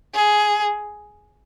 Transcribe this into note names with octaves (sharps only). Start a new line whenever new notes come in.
G#4